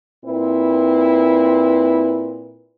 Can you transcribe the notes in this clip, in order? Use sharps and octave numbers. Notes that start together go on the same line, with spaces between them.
A#2 C4 E4 B4